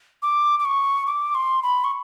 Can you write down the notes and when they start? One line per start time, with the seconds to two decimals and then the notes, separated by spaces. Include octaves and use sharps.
0.22 D6
0.59 D6
0.65 C#6
1.07 D6
1.35 C6
1.63 B5
1.84 C#6